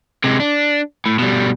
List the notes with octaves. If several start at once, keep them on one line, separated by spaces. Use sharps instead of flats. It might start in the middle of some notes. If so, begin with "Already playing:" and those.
C3 G#3
D4
A2
B2 G3